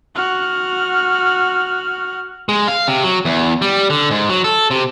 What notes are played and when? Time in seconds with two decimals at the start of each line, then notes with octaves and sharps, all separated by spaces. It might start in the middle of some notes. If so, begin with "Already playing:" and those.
0.15 F#4 F6
2.49 G#3
2.68 F5
2.87 C3
3.04 F#3
3.25 E2
3.62 G3
3.90 D3
4.11 G#2
4.30 F#3
4.44 A4
4.71 C3